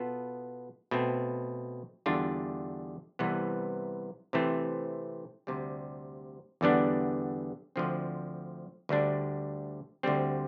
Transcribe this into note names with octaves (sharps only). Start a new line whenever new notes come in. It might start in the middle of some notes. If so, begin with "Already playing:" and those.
Already playing: B2 B3 F4 A4
B2 A3 C4
E2 D3 G3 D4 F4
C2 C3 E3 B3
C3 E3 A3 C4
D2 C3 G3
E2 D3 G3 B3 D4
D2 D3 F3 C4
D2 D3 G3 D4
D2 D3 G3 C4